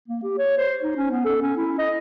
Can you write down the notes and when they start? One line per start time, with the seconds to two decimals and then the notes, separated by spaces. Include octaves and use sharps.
0.08 A#3
0.23 G4
0.38 C#5
0.57 C5
0.83 D#4
0.97 C#4
1.11 B3
1.25 A4
1.42 C#4
1.57 E4
1.79 D#5